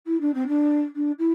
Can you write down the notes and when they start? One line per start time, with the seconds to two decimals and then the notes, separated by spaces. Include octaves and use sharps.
0.06 E4
0.20 D4
0.33 C4
0.47 D4
0.95 D4
1.18 E4